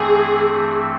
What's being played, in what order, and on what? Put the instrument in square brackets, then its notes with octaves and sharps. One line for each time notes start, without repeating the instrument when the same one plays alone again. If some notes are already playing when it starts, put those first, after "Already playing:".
Already playing: [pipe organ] G2 E3 A3 C4 [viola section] G#4